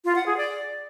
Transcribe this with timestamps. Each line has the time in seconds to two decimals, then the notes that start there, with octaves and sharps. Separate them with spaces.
0.05 F4
0.15 F#5
0.26 G#4
0.37 D5